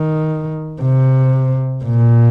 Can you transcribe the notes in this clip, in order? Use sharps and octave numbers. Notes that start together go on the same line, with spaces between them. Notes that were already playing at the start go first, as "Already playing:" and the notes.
Already playing: D#3
C3
A#2